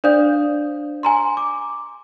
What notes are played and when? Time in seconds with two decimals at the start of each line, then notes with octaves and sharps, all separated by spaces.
0.04 D4 C5 D5 F5 D#6 G6
1.03 G#5 A#5 C6
1.37 D6